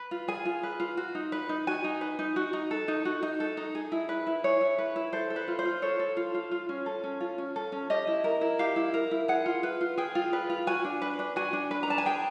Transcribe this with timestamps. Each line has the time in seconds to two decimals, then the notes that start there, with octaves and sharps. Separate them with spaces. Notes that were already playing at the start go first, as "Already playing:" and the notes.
Already playing: B4
0.11 F4
0.28 G#4 G#5
0.45 F4
0.63 B4
0.80 F4
0.97 F#4
1.15 D#4
1.32 B4
1.49 D#4
1.67 F#4 G#5
1.84 D#4
2.01 B4
2.19 D#4
2.36 F#4
2.53 D#4
2.71 A4
2.88 D#4
3.05 F#4
3.23 D#4
3.40 A4
3.57 D#4
3.75 G#4
3.92 E4
4.09 B4
4.27 E4
4.44 G#4 C#5
4.61 E4
4.78 B4
4.96 E4
5.13 A4 C5
5.30 A4
5.36 B4
5.48 F4
5.59 C5
5.65 F4
5.82 A4 C#5
5.99 A4
6.17 F4
6.34 F4
6.51 F4
6.69 C#4
6.86 A4
7.04 C#4
7.21 F4
7.38 C#4
7.56 A4
7.72 C#4
7.90 G4 D#5
8.07 E4
8.24 A#4
8.41 E4
8.59 G4 F5
8.76 E4
8.94 A#4
9.11 E4
9.28 G#4 F#5
9.46 F4
9.63 B4
9.81 F4
9.98 G#4 G5
10.15 F4
10.33 B4
10.50 F4
10.67 F#4 G#5
10.85 D4
11.02 B4
11.19 D4
11.36 F#4 G#5
11.53 D4
11.71 B4
11.83 A#5
11.88 D4 A5
11.98 G#5
12.06 G#4 G5